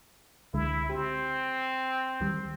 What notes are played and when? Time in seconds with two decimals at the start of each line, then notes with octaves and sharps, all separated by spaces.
0.54 C#2 D3 G#3 E4
0.89 C4 G4
2.20 D2 D#3 G3